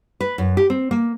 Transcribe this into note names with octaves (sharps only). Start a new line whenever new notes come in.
B4
F#2
G4
C4
A#3